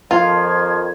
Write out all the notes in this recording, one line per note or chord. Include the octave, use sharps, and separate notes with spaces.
F2 D#3 F3 F4 F5 G#6